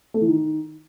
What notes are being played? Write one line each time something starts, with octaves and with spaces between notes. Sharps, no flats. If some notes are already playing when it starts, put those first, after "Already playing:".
A3
E3
D#3